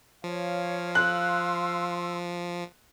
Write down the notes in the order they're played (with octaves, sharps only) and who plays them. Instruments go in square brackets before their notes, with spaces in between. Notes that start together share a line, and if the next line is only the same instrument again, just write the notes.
[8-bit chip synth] F3 [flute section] C#5 [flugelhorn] F5
[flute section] C6 E6 [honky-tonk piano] F#6